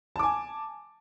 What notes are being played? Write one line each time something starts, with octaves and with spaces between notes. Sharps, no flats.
G#5 A5 D6